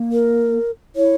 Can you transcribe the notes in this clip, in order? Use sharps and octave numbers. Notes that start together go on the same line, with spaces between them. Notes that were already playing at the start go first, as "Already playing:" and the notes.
Already playing: A#3
A#4
E4 C#5